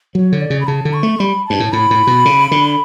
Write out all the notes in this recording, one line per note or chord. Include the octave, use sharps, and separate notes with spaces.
F#3 C#5
D3
D5
C#3
B5
C#3 A5
D3
C#6
A3
G3 B5
G2 A5
A2
A2 B5
A2
B2
C#3
D3